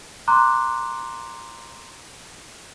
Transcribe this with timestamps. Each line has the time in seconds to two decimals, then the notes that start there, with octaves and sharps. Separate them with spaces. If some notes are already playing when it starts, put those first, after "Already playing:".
0.28 A#5 C6 D6 F#6